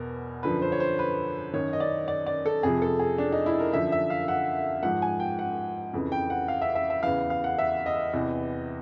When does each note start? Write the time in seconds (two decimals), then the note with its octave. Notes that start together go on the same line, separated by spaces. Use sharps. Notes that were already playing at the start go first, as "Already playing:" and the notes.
Already playing: E2 B2 A#4
0.43 F#2 D3 F3 B4
0.62 C5
0.72 C#5
0.80 C5
0.99 B4
1.53 F#2 D#3 C#5
1.73 D#5
1.80 D5
2.08 D5
2.26 D5
2.46 A4
2.63 F2 C3 F3 G#4
2.82 A4
2.99 G#4
3.18 D4
3.32 D#4
3.46 E4
3.59 A#4
3.73 F#2 D3 F3 E5
3.92 E5
4.10 F5
4.28 F#5
4.83 G#2 F3 F#5
5.02 G#5
5.20 G5
5.39 F#5
5.93 F2 C#3 E3
6.12 G5
6.30 F#5
6.48 F5
6.62 E5
6.75 E5
6.90 E5
7.03 E2 C#3 E3 F5
7.30 F5
7.44 F#5
7.58 E5
7.86 D#5
8.13 E2 C3 E3